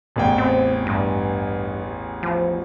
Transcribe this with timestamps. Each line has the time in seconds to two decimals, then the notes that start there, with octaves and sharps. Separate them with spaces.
0.16 A1 E2 G5
0.38 C4
0.87 G2
2.23 F3